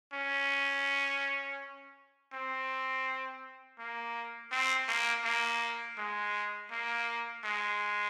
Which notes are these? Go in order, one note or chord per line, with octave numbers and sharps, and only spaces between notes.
C#4
C4
A#3
C4
A#3
A#3
G#3
A#3
G#3